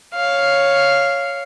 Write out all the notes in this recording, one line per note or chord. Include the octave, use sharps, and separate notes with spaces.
C#5 F5